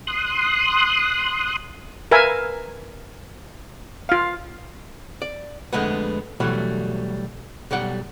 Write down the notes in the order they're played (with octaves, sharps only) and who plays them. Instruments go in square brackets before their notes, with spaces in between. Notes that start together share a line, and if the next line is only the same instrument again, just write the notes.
[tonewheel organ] C6 D#6 F#6
[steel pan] A#4 B4 E5 F5 G#5
F4 F5
[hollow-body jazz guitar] D5
F2 D3 G#3 A3 B3
B2 E3 F#3 G3 A3
B1 G3 D5 F#5